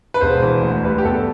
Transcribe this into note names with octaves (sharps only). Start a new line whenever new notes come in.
B4
E1 C5
E3
D2
G3 B4
G4
E2 A4